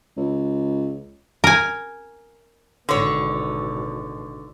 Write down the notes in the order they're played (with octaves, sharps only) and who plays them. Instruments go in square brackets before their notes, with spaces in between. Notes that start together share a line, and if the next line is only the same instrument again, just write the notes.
[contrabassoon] C#2
[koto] A#4 G#5
[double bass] G#1 B2 [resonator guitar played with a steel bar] D3 C#5